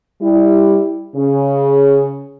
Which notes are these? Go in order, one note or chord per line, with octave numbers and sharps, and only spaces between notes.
G3 E4
C#3